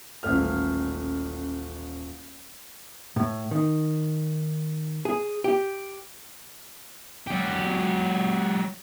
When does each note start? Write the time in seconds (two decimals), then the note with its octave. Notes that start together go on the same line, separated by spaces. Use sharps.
0.23 D#1 A1 A3 F6
3.16 A2
3.51 D#3
5.05 G#4
5.44 G4
7.27 F#3 G4